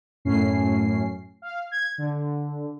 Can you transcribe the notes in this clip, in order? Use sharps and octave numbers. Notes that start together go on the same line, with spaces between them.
F#2 A2 C#4 C7
F5
G#6
D3